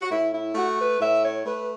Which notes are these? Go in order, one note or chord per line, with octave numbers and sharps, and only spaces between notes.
F#4
A2 E4
E4
A3 F#4
B4
A2 E5
C#5
A3 B4